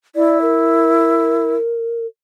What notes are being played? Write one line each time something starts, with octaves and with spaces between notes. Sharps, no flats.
E4 D5
A#4